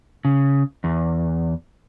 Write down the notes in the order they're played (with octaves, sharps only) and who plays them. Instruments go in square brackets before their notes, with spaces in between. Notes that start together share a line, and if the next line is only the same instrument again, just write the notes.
[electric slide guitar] C#3
E2